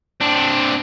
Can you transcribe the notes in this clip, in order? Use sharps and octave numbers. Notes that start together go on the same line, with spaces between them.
C4 D4